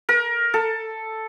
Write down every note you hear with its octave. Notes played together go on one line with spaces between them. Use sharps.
A#4
A4